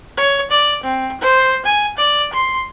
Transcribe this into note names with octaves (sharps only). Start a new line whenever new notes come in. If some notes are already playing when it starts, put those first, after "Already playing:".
C#5
D5
C4
C5
G#5
D5
C6